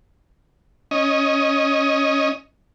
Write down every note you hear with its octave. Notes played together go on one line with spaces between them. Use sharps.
C#4 D#5